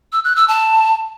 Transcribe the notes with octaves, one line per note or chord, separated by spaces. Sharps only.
E6
F#6
E6
A5